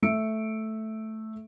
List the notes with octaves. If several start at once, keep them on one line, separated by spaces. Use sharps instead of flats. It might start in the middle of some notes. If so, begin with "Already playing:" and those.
A3 E5 E6 C#7 D7